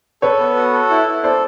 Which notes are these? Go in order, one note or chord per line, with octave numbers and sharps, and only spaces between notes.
A4 B4 C#5
B3
F#4
A4
E4
E4
A4 C5 D5